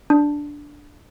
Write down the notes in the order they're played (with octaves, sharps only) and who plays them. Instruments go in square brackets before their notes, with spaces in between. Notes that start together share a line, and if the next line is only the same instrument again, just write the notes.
[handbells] D4